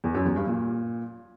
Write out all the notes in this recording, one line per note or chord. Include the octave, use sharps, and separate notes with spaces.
E2
F#2
E2
G2
A#2